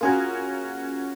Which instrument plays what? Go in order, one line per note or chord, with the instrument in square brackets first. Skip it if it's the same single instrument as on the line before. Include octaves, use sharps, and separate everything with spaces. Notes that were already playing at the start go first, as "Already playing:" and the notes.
[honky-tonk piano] A#3 C#4 F#4 [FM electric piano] F4 G#4 A#4